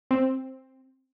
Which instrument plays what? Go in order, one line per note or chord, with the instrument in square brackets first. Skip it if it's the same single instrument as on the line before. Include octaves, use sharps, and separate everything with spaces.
[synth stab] C4